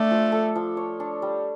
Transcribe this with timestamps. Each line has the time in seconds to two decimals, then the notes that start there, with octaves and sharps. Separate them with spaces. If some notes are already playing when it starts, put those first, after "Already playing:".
Already playing: A3 D4
0.11 F3
0.32 A4
0.55 F3
0.77 C#5
1.00 D4
1.22 G3